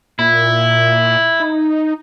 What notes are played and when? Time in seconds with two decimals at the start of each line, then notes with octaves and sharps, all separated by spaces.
0.19 A#2 E4
1.40 D#4